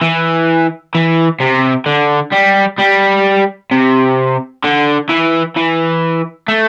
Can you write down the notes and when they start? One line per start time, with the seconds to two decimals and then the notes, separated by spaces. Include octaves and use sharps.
0.01 E3
0.95 E3
1.40 C3
1.86 D3
2.32 G3
2.79 G3
3.72 C3
4.64 D3
5.09 E3
5.56 E3
6.48 A3